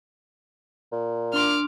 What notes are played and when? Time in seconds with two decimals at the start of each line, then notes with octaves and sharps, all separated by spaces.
0.92 A#2
1.33 D4 C6 D6 F6